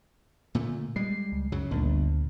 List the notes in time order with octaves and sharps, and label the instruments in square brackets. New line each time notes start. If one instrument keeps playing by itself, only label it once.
[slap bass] A#2 D3 A3
[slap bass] G3 G#3 [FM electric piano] C7
[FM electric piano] C#2
[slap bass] F#2 C#3 F#3
[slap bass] G1 [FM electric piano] D2 A#2 D3